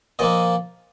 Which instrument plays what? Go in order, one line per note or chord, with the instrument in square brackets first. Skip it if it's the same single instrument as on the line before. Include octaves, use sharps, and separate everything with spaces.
[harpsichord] A#2 F3 A#3 D#5